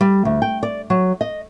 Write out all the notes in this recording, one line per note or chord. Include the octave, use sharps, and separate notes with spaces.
G3
D2
G5
D5
F#3
D#5